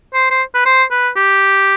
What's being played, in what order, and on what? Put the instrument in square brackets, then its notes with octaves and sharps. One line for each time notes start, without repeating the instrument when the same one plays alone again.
[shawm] C5
C5
B4
C5
B4
G4